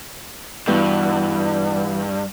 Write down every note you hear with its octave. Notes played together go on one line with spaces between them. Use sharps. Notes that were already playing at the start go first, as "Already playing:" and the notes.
G2 E3 B3 F#4